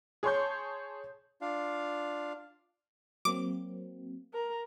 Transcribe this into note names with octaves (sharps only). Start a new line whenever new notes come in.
G#4 C#5 A5 C6 C#6 G6
D4 F4 F5
F#3 A#3 C4 D6
A#4